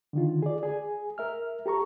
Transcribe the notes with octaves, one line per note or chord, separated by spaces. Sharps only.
D3 D#3 F4
G#4 D5
G#4 G#5
A#4 E5 F6
G4 A4 A#5 C#6